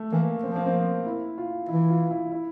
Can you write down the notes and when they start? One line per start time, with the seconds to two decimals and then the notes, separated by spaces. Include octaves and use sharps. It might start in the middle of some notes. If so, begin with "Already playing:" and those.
Already playing: A3
0.12 E3 A#3
0.43 F3 C4
0.56 A#3
0.67 C4
1.06 E4
1.38 F4
1.69 E3 E4
1.90 F4
2.11 E4
2.32 E4